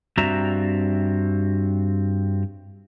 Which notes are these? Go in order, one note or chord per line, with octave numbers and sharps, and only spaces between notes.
G2 C4 F#4 D5 E5 A#5